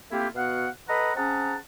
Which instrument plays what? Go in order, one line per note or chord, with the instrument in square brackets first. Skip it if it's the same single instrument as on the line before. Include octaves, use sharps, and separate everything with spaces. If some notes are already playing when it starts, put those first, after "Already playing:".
[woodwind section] A3 A#3 C4 E4 F4 G4
B2 B3 F#4 F5 F#5
A4 B4 D#5 F#5 A#5 B5
C4 C#4 G#4 F#5 A5 A#5